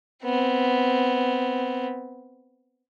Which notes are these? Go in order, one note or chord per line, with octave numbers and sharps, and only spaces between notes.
B3 C4